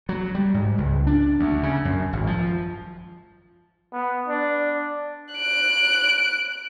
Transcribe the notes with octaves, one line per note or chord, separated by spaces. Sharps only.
F#3
G3
G#2
C#2
D4
D2
C#3
F#2
G#1
F3
B3
D4
F#6 D7